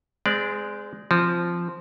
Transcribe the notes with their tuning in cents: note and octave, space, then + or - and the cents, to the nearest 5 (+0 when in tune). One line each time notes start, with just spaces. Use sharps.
G#3 +0 C4 -35 D5 +0
F3 -10 C4 +0